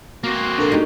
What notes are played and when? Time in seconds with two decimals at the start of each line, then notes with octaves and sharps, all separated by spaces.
0.24 A#3 C4 F#4
0.58 D4 A4 A#4
0.72 D#4 G4